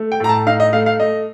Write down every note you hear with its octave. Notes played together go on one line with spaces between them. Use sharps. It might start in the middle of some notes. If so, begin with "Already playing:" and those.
Already playing: A3
G5
A2 A#5
A5
D#4 F5
D#5
A3 F5
F5
A3 D#5